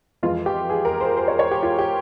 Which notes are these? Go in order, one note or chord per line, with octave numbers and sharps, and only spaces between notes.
F2 E3 G#3 F4
G4
G#4
A#4
C5
C5
C#5
C#5
G4
F4
G4